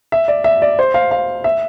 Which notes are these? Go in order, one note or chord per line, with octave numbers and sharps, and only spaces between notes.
E5
D5
E5
D5
C5
F5
F5
E5